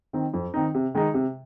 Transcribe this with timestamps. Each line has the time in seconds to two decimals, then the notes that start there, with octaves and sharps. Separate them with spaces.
0.13 D#3 C4 D#4
0.34 F2
0.54 D#3 C4 D#4
0.74 C3
0.95 D#3 G#3 D#4
1.14 C3